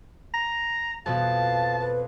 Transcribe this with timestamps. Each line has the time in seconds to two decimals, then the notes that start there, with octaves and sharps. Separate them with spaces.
0.34 A#5
1.06 F2 B2 B3 F5 A5
1.80 B4